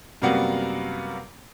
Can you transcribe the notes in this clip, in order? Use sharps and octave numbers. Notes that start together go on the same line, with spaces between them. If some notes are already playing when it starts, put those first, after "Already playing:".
F#2 C3 G3 A#3 B3 F#4